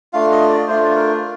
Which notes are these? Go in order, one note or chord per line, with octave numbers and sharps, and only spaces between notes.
A3 D4 F4 F5
D#5
D5
A3 D4 F4 C5
A#4